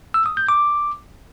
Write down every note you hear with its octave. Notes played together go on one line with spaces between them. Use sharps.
E6
D#6
G6
D6